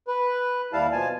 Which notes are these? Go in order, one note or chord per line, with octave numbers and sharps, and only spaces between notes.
B4
D#2 G3 E4 F5 A5
B2 F3 G#5 A5